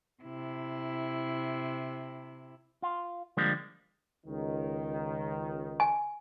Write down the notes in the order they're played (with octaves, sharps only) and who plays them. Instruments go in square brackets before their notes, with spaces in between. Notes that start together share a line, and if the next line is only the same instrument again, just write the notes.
[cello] C3 E4
[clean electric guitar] F4
D3 F3 G3 G#3 A#3
[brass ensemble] C#2 D#3
[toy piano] G#5